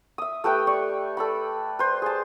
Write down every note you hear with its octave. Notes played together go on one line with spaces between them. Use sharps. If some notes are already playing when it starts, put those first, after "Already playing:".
E5 D#6
A3 G4 B4 G5
D5 C#6
A4 D5 B5
B4 C5
G#4 A5